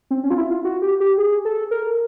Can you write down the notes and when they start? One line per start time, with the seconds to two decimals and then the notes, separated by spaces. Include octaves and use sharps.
0.11 C4
0.24 C#4
0.30 F4
0.38 E4
0.50 F4
0.65 F#4
0.82 G4
1.00 G4
1.18 G#4
1.45 A4
1.71 A#4